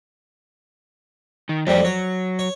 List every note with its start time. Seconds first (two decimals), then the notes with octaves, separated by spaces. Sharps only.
1.49 D#3
1.67 F2 F#3 G3 A3 G4
1.85 F#3 C#5
2.39 C#5